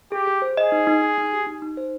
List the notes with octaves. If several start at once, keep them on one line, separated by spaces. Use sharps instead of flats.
G4 G#4
G#4
C5
G#4 D#5
D#4
D#4
D#4
D#4
G4
D#4
D#4
C5